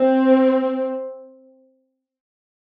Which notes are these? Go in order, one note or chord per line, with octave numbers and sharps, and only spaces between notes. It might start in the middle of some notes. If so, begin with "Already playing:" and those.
Already playing: C4